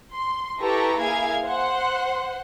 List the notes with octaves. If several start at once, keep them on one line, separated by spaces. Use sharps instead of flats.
C6
E4 G4 A4 B4 A#5 C#6
A#3 E4 G#4 F5 G#6
C5 F#5 C6